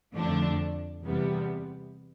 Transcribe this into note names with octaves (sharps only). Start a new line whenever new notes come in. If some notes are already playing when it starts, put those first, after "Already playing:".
F2 D3 F3 A3 D4
E2 C3 G3 B3